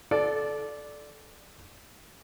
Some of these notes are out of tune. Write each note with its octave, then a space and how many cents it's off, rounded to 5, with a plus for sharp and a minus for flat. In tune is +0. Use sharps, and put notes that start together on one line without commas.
A4 -20 D5 +0